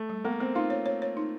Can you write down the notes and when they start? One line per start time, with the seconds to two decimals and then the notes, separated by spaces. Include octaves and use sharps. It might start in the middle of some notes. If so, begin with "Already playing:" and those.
Already playing: A3
0.09 G3
0.24 A#3 B3
0.40 B3 C4
0.55 D#4 F4
0.70 C#5
0.86 C#5
1.02 C#5
1.17 D#4